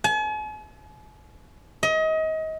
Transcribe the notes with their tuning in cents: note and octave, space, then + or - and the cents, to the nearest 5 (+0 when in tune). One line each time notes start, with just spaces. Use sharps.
G#5 +45
D#5 +30